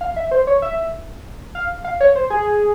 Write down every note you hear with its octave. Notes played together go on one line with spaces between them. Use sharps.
F5
E5
C5
C#5
E5
F5
F5
C#5
C5
G#4